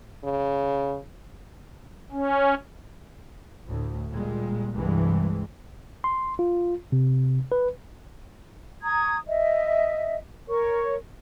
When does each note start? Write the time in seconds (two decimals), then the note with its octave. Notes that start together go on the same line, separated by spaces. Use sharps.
0.24 C#3
2.12 C#4
3.66 D2 A2
4.12 A#2 G3 G#3
4.74 C2 G2 E3 G#3
6.04 C6
6.39 F4
6.92 C3
7.52 B4
8.83 A#5 C#6 D#6 G#6
9.28 D#5 E5
10.47 A#4 C#5 C#6